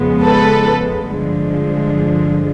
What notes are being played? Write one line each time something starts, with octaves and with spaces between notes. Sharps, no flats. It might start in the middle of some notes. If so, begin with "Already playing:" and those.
Already playing: F2 C#3 F3 G#3 B3
A4 B4
G2 D3 F3 G#3